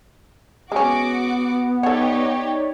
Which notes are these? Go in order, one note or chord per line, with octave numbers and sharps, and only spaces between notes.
G#3 B3 C#4 F#4 D6
D#4 G4 A4 C#5 D5 F#5